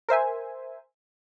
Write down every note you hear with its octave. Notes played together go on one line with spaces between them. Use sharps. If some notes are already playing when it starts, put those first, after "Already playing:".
A#4 C5 E5 G#5